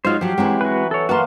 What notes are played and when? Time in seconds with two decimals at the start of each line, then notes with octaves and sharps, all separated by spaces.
0.05 F#3 G#3 D#4 F4 C5
0.21 F3 F#3 G4
0.38 E3 F#3 G#3 C4 E4
0.61 F#4 B4
0.91 A4 C#5
1.09 F#3 A#3 F4 F#4 B4 F5 A5 C6